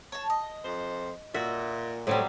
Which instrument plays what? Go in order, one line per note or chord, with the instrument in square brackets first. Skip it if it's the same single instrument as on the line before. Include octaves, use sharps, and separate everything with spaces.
[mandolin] C#5 A5
D#5
[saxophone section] F2 C5
[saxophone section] A#2 [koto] F#4 [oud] E5
[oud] A2 C4 [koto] C3 F#3 G3